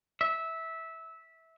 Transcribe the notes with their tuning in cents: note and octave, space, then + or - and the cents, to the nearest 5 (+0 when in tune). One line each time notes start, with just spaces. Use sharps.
E5 -15